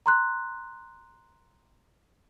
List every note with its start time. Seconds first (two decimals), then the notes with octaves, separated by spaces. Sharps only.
0.06 A#5 C6 F#6